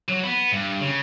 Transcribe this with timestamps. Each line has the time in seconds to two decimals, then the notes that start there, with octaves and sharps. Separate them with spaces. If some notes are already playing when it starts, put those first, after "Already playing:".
0.09 F#3
0.24 B3
0.51 G2
0.80 C#3